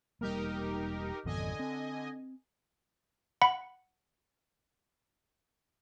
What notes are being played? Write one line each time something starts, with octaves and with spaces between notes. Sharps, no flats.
E1 G3 A#3 D#4 G4 A#4
G#1 F2 B2 D3 D#5 G#5
C4
F#5 B5